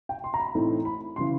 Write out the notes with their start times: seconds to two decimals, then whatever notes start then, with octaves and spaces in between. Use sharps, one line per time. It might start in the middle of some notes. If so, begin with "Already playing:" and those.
0.09 G5
0.24 C6
0.34 A#5
0.40 B5
0.55 A2 E3 A3 C4 D#4
0.85 B5
1.16 C#3 E3 C6